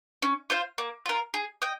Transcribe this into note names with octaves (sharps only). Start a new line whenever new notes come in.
C#4
F4 C5 F5
A#3
F4 A#4
G#4
D#5 G5